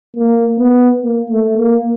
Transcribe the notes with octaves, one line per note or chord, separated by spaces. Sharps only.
A#3
B3
A#3
A3
A#3